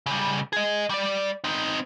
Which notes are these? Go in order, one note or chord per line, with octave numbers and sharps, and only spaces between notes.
C#3 G3
G#4 D#5
G3 D5
C4 D#4